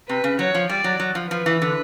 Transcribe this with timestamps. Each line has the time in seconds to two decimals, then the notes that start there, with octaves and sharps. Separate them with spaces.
0.09 C3 B4
0.24 C#3
0.39 F#3 C#5
0.55 F3
0.69 G3 D5
0.84 F#3
1.00 F#3
1.15 F3
1.31 F3 B4
1.46 E3
1.62 D3